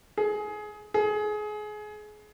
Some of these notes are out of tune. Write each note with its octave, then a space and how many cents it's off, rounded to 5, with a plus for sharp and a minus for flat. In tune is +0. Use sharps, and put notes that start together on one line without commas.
G#4 +20
G#4 +25